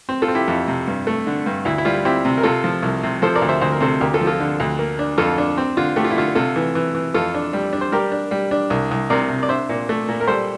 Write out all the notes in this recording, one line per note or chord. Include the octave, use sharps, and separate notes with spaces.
C4
F4 A4
C4
E4 G4
F2 E4
C3
G2
A3
D3
G2
D2 E4
E4
G3 F4
C4 E4 G4
C3
A#4
C3 F4 A4
F3
C2
C3
F3 A4 C5
A#4 D5
D2
C5 E5
D2 C5
A#4
C3 A4 C5
D2 G4 A#4
F4 A4
F3
F4 A4
D3
D2
A#3
D4
F2 F4 A4
D4
C4
D3 F4
A3 G4
F4
E4
D3 F4
C3 F4 A4
E3
E3
E3
F2 F4 A4
D4
G3
D4
C5
G3 G4 A#4
D4
G3
D4
C2
C2
C3 A#4 D5
C3
D5
D4 C5 E5
A#2
A3
A#2
A#4
G3 A4 C5